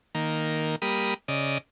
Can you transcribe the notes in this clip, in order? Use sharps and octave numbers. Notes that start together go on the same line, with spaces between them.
D#3 A#3
G3 A#3 B5 D#6
C#3 D5 D#5